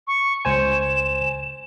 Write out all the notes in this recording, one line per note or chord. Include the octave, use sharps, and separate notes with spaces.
C#6
C#2 C5 G#5 E7